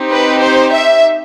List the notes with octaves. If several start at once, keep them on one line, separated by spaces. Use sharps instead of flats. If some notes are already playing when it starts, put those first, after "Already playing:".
Already playing: C4 D#4 G4
B4
C5
E5